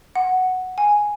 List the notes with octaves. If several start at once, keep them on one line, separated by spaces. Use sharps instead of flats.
F#5
G#5